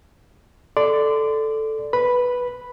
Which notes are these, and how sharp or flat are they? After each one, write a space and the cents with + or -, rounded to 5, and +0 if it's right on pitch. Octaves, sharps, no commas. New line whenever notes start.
A4 +0 D5 +0 C6 -30
B4 -5 B5 +0